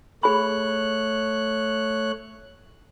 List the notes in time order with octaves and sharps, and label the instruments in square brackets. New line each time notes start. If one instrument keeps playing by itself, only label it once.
[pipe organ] A3 C#5 F#6 [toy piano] G#4 B5